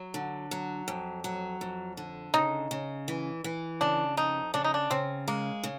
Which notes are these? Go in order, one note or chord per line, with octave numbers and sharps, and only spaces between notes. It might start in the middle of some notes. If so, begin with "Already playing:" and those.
Already playing: F#3
D3
F#3
F2
F#3
F2
D3
C#3 D#4
C#3
E3
E3
C#3 D4
F2 D#4
C#3 D4
D#4
D4
C#3 C4
G#3 A#3
C#3